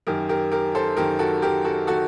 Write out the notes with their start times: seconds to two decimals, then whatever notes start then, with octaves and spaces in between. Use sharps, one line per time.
0.07 F#2 D#3 G4 A#4
0.29 G4 A#4
0.52 G4 A#4
0.75 A4 C5
0.97 F#2 D#3 G4 A#4
1.19 F#4 A4
1.42 G4 A#4
1.64 F#4 A4
1.87 D#3 F#4 A4